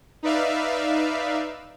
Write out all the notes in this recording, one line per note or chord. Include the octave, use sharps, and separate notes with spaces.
D#4 B4 D5 E5 F5